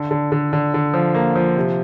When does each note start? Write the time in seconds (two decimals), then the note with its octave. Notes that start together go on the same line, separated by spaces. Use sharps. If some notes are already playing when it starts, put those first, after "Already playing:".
Already playing: D3
0.11 D3
0.32 D3
0.53 D3
0.74 D3
0.94 F3
1.14 A#3
1.36 F3
1.57 C3